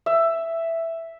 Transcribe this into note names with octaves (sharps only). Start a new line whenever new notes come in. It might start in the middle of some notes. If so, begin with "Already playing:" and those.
E5